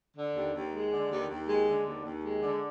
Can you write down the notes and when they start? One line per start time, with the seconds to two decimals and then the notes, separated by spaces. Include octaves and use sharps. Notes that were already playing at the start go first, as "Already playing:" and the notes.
0.17 D3
0.35 D#2
0.55 D#2
0.74 G#3
0.92 D3
1.11 D#2
1.30 D#2
1.48 G#3
1.67 D3
1.87 D#2
2.04 D#2
2.24 G#3
2.42 D3